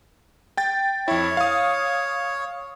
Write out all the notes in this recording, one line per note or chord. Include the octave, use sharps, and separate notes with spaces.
G5 A6
F2 E4 C#5
F5 D#6